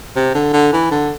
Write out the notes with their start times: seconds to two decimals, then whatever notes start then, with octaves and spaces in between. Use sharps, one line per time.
0.16 C3
0.34 D3
0.53 D3
0.73 E3
0.91 D3